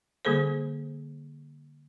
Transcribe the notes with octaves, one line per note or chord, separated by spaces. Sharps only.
D3 G3 A#3 G#4 A4 C5